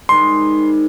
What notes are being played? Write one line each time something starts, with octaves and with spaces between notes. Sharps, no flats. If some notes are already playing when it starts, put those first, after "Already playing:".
G#2 D#3 G3 C6